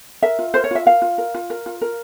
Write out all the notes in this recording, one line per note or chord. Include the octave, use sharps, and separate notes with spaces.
A#4 E5
F4
A#4 C5
C#5
F4 E5
A#4 F5
F4
A#4
F4
A#4
F4
A#4